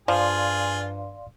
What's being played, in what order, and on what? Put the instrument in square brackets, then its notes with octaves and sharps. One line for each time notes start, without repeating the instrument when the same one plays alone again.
[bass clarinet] G2 [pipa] F3 [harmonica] F4 G#4 [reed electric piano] D5 F5 C6